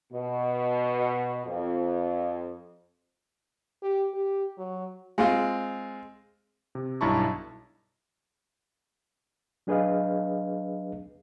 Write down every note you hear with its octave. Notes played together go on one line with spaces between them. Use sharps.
B2
F2
G4
G4
F#3
G#3 C4 F4
C3
B1 G2 E4 A5 A#5 C#6
F#3 D4 G#4 B4 D#5 F5